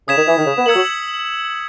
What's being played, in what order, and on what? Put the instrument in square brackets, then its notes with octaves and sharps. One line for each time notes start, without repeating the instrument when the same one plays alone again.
[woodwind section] C#3 [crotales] D#6 G#6 B6 E7
[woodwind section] D#3
E3
D#3
C#3
B3
[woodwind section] A#3 [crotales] E6 G#6 C#7 F#7
[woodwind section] F#3